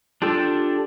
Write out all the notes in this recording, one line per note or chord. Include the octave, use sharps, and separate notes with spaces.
D4 F4 G4 A4